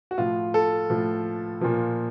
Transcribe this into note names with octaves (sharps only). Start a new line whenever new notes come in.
F#4
A2 F3 F4
A4
A2 F3
A#2 F3